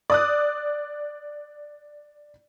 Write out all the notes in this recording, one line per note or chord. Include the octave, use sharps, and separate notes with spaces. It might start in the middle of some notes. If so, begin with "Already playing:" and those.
D5 D#6 F#6